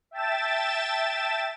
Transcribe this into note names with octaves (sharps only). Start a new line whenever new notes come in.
E5 G5 A5 A6 E7